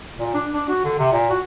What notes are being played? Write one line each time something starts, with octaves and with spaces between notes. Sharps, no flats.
A#2
D4
D4
F#4
D3
C3
A#2
F#4